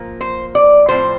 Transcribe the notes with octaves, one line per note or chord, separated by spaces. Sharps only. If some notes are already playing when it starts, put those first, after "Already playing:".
Already playing: A#2 F3 A#3
C5
D5
A2 F3 C4 C5